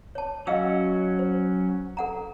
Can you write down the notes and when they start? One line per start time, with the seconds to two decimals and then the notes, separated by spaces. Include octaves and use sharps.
0.15 C#5 A5
0.47 F#3 C#4 F#4 D#5 F5 E6
1.19 C5
1.97 A4 F#5 A#5